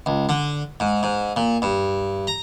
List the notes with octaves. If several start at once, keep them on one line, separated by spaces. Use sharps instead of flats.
C#2
D3
G#2
G#2
A#2
G2
A#5